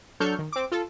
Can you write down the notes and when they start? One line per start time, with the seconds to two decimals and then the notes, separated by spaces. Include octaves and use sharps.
0.20 F#3 D4 A4 C#6 F6 G6
0.39 D#3
0.52 C4 D6
0.72 F4 A4